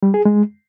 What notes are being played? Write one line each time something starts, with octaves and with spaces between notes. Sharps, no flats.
G3
G#4
G#3